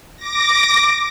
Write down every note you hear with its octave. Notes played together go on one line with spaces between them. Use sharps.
D6 A#6